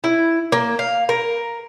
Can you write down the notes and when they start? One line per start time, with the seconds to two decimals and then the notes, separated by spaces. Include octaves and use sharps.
0.04 E4
0.52 A#3
0.79 F5
1.09 A#4